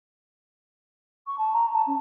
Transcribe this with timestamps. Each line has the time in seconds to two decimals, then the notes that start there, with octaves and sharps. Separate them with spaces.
1.26 C#6
1.38 A5
1.53 A#5
1.73 A5
1.87 C#4